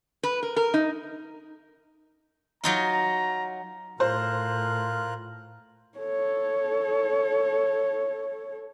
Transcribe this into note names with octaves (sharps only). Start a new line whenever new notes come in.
B4
A#4
A#4
D#4
F#3 D#4 F4 A#5
A2 F4 A#4 C5 F#6
A4 C#5